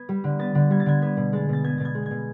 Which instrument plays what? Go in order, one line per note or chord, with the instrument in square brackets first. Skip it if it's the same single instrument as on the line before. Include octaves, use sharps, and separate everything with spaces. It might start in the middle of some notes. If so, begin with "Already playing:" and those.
Already playing: [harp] B3 G#6
G3
D3
B3 A6
D3
G3 G#6
A6
D3 G#6
B3 G#6
B2
G#3 A6
B2 A6
B3 G#6
B2 A6
G#6
G#3
B2 G#6